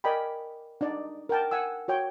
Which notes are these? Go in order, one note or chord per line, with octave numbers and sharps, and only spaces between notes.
A#4 D5 D#5 G5 G#5 B5
D4 D#4 D5
A#4 F#5 G5 A5
F#5 G#5 E6
F#4 C#5 G5